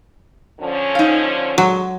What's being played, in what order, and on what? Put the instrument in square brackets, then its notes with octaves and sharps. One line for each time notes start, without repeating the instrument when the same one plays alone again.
[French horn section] D3 F3 C#4
[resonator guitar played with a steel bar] D#4 F5
[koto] F#3 [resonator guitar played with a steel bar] G#3